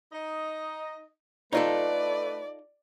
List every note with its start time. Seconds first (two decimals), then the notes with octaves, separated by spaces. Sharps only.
0.12 D#4 D#5
1.52 A3 D#4 F4 A4 B4 D5